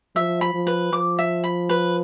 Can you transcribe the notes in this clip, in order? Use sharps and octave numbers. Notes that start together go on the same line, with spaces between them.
F3 E5
B5
F3
B4
F3 D6
E5
B5
B4